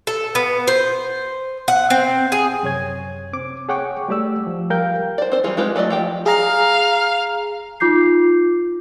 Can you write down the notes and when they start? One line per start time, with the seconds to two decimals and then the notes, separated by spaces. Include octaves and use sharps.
0.07 A4
0.35 B3
0.67 C5
1.68 F#5
1.90 C4
2.32 G#4
2.63 F#2 C3 C#5 G#6
3.33 C4 D6
3.69 G#4 C#5 F#5 G5 C#6 D6
4.08 G3 A3 G4 D5 E6
4.47 F3
4.70 G3 A#4 F5 G5 G6
5.18 C5 D5
5.32 C4 C5
5.44 E3 G3 F4 G#4
5.57 G#3 F4 G4 B4
5.76 F#3 A3 D5 D#5
5.90 F3 G4 G5
6.26 G#4 F5 A#5
7.80 D#4 F4 D6 G6 C7